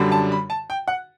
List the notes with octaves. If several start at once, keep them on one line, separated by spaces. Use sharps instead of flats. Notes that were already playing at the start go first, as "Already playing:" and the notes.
Already playing: F#2 D3 G3 D4
A5
B5
A5
G5
F#5